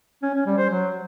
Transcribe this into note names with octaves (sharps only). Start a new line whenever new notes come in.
C#4
C#4
G3
C5
F#3